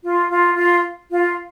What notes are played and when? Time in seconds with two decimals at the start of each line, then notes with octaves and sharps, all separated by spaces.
0.02 F4
0.30 F4
0.56 F4
1.10 F4